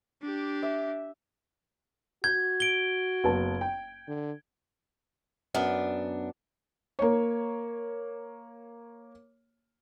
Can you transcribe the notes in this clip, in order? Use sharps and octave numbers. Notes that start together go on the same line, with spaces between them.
D4 G4
E5
F#4 G6 G#6
D7 G7
F#1 B3 A5
G5
D3
F#2 B3 D4
A#3 C#5